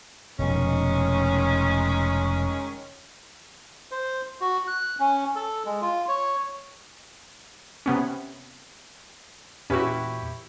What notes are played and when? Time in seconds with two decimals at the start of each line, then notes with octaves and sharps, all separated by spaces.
0.39 F1 B2 D#3 G#3 C#4
3.91 C5
4.41 F#4
4.67 F#6
5.00 C#4
5.36 A4
5.66 G#3
5.82 F4
6.08 C#5
7.86 C3 B3 C#4
9.70 E2 A#2 C#4 E4 F#4 G4 B4 C#6